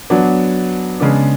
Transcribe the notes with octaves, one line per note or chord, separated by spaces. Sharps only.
F#3 B3 D4
C#3 G#3 B3 D4